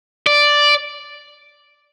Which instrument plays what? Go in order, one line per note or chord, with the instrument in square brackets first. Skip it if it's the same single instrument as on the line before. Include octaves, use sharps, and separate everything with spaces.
[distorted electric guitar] D5